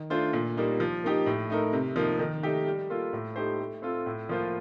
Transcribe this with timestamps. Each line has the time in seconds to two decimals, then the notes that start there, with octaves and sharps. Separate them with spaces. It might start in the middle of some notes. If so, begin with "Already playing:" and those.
Already playing: D#3
0.10 A3 D4 F4 C5
0.33 A#2
0.57 G3 A#3 D#4
0.80 F3
1.04 A#3 D#4 G4
1.26 A2
1.50 A3 D#4 A#4
1.73 C3
1.96 F3 A#3 D#4
2.19 D#3
2.43 A3 D#4 G4
2.67 G3
2.90 A#3 F4 A4
3.13 A2
3.36 A3 D#4 G4 C5
3.60 A3
3.82 C4 F4 A4
4.06 A2
4.29 F3 A#3 F4 C5